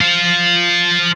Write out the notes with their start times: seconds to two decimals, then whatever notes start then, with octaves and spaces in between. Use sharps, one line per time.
0.01 F4 C5